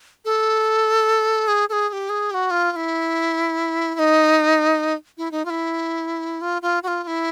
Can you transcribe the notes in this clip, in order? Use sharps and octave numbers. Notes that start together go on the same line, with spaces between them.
A4
G#4
A4
G#4
G#4
G4
G#4
G4
F#4
F4
F4
E4
E4
D#4
E4
D#4
F4
E4
F4
F4
F#4
F4
F4
E4